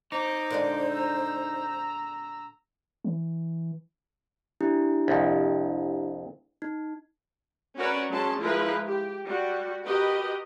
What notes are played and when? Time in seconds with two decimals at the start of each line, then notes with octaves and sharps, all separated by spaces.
0.12 D#4 C5 D6
0.50 A#2 D3 G#3
0.91 A#5 E6
3.05 E3
4.61 D4 E4 G4
5.08 C2 F2
6.62 D#4
7.77 C#4 F#4 A#4 B4 C#5 D5
8.10 F#3 G#3 C#4 A5 C6
8.40 F3 G#3 E4 F4 A#4 B4
8.86 G4
9.25 G3 F#4
9.86 F#4 G4 A#4 B4 D#5